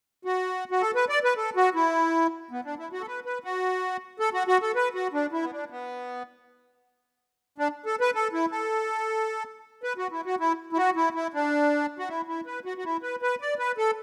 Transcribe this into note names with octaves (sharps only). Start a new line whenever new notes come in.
F#4
F#4
A4
B4
D5
B4
A4
F#4
E4
B3
D4
E4
F#4
A4
B4
B4
F#4
A4
F#4
F#4
A4
B4
F#4
D4
E4
B3
D4
B3
D4
A4
B4
A4
E4
A4
B4
F#4
E4
F#4
E4
E4
F#4
E4
E4
D4
F#4
E4
E4
B4
F#4
F#4
E4
B4
B4
D5
B4
A4